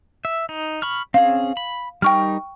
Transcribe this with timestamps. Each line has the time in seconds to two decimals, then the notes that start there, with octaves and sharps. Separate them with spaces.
0.25 E5
0.49 D#4
0.82 B5 C#6 F6
1.14 C4 C#4 G#4 F5
1.57 B5
2.02 G3 D#4 A#4 G5 C#6 F6